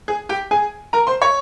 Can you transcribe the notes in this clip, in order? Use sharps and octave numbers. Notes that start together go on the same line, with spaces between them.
G#4
G4 G5
G#4 G#5
A#4 A#5
C5 C6
C#5 C#6